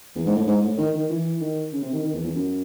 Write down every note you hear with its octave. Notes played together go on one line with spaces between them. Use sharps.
E2
G#2
A2
G#2
A2
D#3
D#3
E3
D#3
C#3
C3
D#3
D#3
E2
E2
F#2